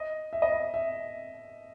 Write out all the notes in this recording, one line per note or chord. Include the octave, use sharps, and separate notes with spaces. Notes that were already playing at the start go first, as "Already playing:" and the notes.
Already playing: D#5
E5
D#5
E5
E5